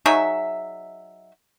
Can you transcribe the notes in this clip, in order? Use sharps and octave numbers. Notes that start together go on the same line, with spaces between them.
F#3 D#4 G#4 E5